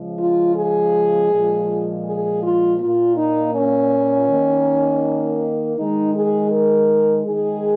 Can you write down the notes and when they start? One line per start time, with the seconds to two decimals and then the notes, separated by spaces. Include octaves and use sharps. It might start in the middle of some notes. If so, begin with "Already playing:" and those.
Already playing: C#3 F3 G#3
0.19 F4
0.56 G#4
1.30 A#2 F3 G#3
2.05 G#4
2.42 F4
2.79 A#2 A#3 F4
3.16 D#4
3.54 C#4
4.29 D#3 A#3
5.77 D#3 G#3 D#4
6.15 G#4
6.52 A#4
7.26 D#3 G#3 G#4